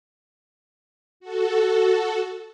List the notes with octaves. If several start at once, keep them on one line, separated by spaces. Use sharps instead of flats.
F#4 A4